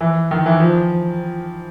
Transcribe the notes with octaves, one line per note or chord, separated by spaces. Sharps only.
E3
D#3
E3
F3